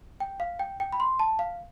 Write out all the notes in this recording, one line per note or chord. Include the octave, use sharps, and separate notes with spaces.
G5
F5
G5
G5
B5
C6
A5
F5